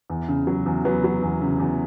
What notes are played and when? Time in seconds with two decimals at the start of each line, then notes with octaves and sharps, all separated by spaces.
0.10 E2
0.29 C#3
0.47 F#3
0.66 E2
0.85 F#3 B3
1.04 F#3
1.22 E2
1.42 C#3
1.60 E2